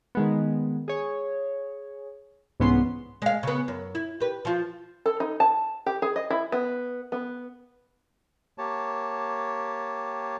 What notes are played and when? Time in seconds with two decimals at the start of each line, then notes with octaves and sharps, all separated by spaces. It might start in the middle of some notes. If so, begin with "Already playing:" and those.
0.15 D#3 G#3 B3
0.88 G#4 C#5
2.60 C2 G#2 E3 B3 C#4 C6
3.22 G#3 F5
3.43 C#3 B3
3.68 F#2
3.95 E4
4.20 G4 B4
4.45 F3 F4
5.06 A4
5.20 D#4
5.40 A5
5.86 G4
6.02 G#4
6.16 D#5
6.30 E4
6.52 B3
7.12 B3
8.58 A#3 G4 C#5 A5